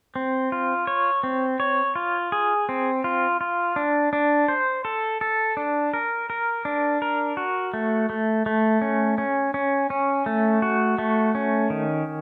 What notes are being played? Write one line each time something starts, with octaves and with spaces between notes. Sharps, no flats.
C4
F4
C#5
C4
C#5
F4
G#4
C4
F4
F4
D4
D4
C5
A4
A4
D4
A#4
A#4
D4
A#4
F#4
A3
A3
A3
C#4
C#4
C#4
C#4
A3
F#4
A3
C#4
D#3